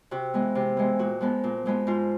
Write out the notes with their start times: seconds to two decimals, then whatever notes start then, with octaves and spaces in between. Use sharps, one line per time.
0.11 C3 F#4
0.34 E3 G#3 B3
0.55 C3
0.77 E3 G#3 B3
0.99 A#2 F#4
1.21 F3 G#3 B3
1.44 A#2
1.66 F3 G#3 B3
1.87 G#2 F4